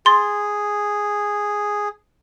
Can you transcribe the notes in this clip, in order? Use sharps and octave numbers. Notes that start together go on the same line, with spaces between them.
G#4 C6 A6